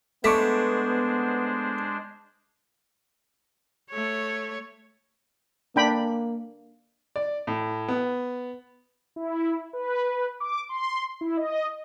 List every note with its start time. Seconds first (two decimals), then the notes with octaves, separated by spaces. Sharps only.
0.24 G#3 A3 B3 D4 C5 C#6 D6 B6
3.90 A3 C#5
5.76 A#3 D4 G5 B5
7.16 D5
7.47 A2
7.88 B3
9.16 E4
9.73 B4
10.40 D6
10.69 C6
11.21 E4
11.37 D#5